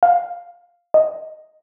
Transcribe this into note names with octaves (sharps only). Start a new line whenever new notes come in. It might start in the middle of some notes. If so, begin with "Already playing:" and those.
F5
D#5